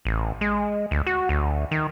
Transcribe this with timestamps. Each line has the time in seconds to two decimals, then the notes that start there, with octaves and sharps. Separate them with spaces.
0.05 A1
0.41 G#3
0.91 D2
1.07 F#4
1.29 D2
1.71 D#3